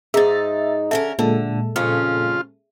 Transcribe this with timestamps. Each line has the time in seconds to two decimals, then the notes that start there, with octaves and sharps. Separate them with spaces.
0.14 G#2 D#4 G#4 E5 A#5 A6
0.91 D3 C#4 A4 A#4 E5
1.19 A#2 D3 G#3 A4
1.76 F2 C#3 C#4 F4